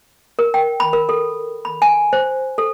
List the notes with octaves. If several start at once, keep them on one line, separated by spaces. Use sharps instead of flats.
A#4
G5
B5
A#4
A4
B5
G#5
C5
A4